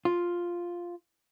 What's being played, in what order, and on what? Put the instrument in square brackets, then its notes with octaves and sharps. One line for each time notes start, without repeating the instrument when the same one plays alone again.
[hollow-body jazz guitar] F4